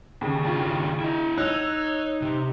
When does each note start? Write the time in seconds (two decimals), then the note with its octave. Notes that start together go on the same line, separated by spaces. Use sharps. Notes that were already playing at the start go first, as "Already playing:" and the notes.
0.21 D#2 C#3
0.45 D4 F4 F#4
1.01 E4 D#5
1.38 D#4 C#5 E6 F#6
2.22 C3